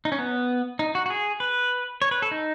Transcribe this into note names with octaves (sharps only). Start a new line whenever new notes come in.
D#4
C#4
B3
D#4
F#4
F#4
G#4
B4
C#5
B4
A4
D#4